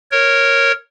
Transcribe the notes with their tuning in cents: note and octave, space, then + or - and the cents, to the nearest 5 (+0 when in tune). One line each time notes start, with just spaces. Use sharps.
A#4 -5 C#5 -10